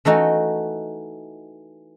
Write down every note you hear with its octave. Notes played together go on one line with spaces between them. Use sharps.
E3 A3 D#4 F#4